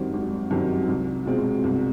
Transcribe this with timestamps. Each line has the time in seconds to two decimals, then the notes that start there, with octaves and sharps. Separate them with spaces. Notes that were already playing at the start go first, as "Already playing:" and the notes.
Already playing: G#1 F#2 D#3 G3 C4
0.13 G#1
0.51 F#2 D#3 G3 C4
0.88 C2
1.26 B2 G#3 C4 F4
1.64 C2